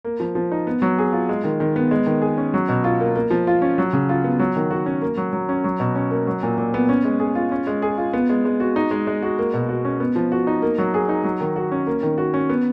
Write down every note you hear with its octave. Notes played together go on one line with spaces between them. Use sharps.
A#3
F3
F3
D#4
B3
F#3
G#4
F4
G#3
D#3
D#3
B3
G#3
D#3
G#4
C#4
F#3
B2
F4
A#3
A#3
F3
F4
C#4
F#3
C#3
F4
B3
F#3
D#3
F#4
C#4
A#3
F#3
F#3
C#4
F#3
B2
C#4
A#3
F#3
A#2
A#2
B3
C#4
G#3
G#4
F4
C#4
G#3
G#4
F4
B3
G#3
G#3
F#4
D#4
G#3
G#3
F#4
A#3
B2
F#4
C#4
B3
F3
F#4
D#4
A#3
F#3
G#4
D#4
F#3
D#3
F#4
C#4
A#3
D#3
F#4
C#4
B3